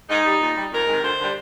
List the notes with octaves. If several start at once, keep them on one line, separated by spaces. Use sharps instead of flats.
G#2 D#4
G3
A#2
G3
F2 A#4
C3 D#3 G#3
D2 C5
D3 G3